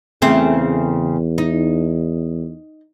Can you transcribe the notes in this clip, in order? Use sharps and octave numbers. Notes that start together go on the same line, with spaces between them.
E2 C#3 A3 C4
D#4